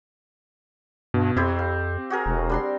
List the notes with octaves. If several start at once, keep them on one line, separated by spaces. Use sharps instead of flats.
G2 B2
F2 C4 E4 G4 C5
F5
F#4 G#4 A#4
E1
G3 D4 C6